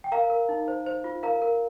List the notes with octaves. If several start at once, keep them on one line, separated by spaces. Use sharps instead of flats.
G5
A#4 F5 A#5
A#4
D#4
C5
C5
F4
A#4 F5 A#5
A#4